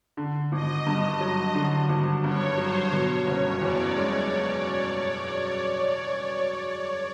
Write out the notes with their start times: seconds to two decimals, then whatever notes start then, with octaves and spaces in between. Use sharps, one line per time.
0.17 D3
0.52 G#1 D#5
0.87 G2 D#5
1.20 F#3
1.55 D3
1.89 G#1
2.24 G2 C#5
2.58 F#3 C5
2.92 B2 C#5
3.27 F#1
3.60 E2 D5
3.96 G#3